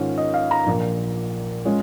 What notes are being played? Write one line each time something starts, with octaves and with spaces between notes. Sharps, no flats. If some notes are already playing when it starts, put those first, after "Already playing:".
Already playing: G#2 D#3 C#4 F4
D#5
F5
A#5
A#1 A#2 A#3
G#3 C#4 F4